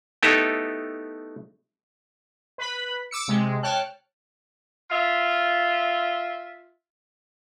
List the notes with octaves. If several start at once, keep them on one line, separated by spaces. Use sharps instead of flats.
A3 B3 D#4 E4 G4 A4
B4 B5
D6 E6 C#7
C3 G#3
C#5 G5 A5 F6 F#6
F4 E5